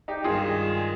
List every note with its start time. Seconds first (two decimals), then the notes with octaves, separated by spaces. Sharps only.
0.08 D#4 G4
0.24 G2 D#3 G#3 F4 G#4